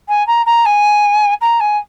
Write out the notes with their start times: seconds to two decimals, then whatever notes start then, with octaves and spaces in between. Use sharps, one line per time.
0.09 G#5
0.27 A#5
0.46 A#5
0.66 G#5
1.41 A#5
1.60 G#5